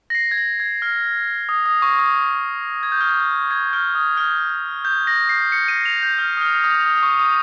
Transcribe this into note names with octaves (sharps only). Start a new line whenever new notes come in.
A#6
C7
G#6
A#6
G#6
F6
D#6
D#6
C#6
D#6
G#6
G6
F6
G6
G#6
F6
D#6
F6
G6
A#6
C7
C#7
D#7
F7
G6
F6
D#6
F6
D#6
D#6
D#6
C#6
D#6